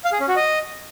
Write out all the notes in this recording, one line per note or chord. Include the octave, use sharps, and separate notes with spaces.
F5
G#4
C#4
F#4
D#5